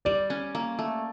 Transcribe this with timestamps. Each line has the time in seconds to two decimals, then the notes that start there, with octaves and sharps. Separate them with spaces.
0.05 G3 D5
0.30 C#4
0.55 A#3
0.79 A3